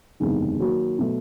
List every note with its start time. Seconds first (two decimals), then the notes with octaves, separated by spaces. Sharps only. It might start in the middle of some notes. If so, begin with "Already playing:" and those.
0.20 F#1 E2 C3 D#3 G#3
0.58 D#3 F#3 A#3 D#4 F#4
0.99 B2 F#3 A3